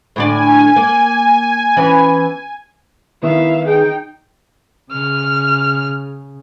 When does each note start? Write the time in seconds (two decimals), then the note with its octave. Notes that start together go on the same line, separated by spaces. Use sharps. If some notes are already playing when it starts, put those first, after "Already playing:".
0.16 A2 D3 D5 G#5
0.76 A#3
1.77 E3 B3 C#4
3.23 D#3 B3 E4 E5 F5
3.66 D#4 G#4 G5
4.92 C#3 F6